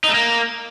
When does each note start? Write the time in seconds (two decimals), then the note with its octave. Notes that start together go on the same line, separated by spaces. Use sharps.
0.04 D#4
0.09 A3
0.14 A#3